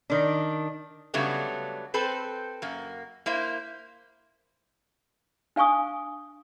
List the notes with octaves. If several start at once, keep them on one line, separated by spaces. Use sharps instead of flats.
D#3 D4
C#3 F#3 G3 A3 B3 D4
C4 A4 B4 C5
F#2 A#3
A#3 E4 C5
D4 F5 G#5 C#6 D#6